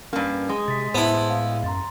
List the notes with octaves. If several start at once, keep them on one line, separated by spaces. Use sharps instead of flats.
G2 A#3 C#4
G#3 D#6
C3 A6 B6
A2 B3 E4 C5 A5 C6
F5
F#2 A#5 C6 A6